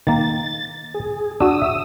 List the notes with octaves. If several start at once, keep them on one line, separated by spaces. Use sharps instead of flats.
D#3 A#3 A6
G#4
D4 F#4 D#6 E6
E5